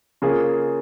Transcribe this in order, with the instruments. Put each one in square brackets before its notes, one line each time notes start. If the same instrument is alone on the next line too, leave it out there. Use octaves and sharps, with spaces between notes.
[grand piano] C#3 A#3 F4 G#4